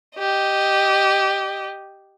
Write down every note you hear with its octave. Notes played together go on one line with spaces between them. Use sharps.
G4 D#5